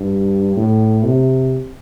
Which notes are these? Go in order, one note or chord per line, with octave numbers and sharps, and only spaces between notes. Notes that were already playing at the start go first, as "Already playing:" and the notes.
Already playing: G2
A2
C3